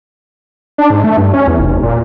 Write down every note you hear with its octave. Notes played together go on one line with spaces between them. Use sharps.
D4
G#2
A3
G2
C#4
E2
F1
A#2